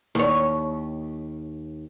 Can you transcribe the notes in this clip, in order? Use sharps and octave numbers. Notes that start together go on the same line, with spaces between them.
D#2 C#5